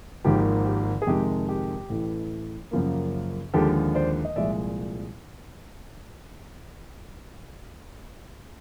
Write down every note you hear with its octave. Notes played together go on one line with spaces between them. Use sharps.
G#1 G#2 F3 A#3 G4
G4
G#4
F2 C3 D#3 G#3 G4
G4
A1 A2 E3 A3
F#2 C#3 F3 A#3
D#2 D3 F3 G#3 G4 A4
C5 D5
D#5
C2 A#2 F3 G#3 D5 E5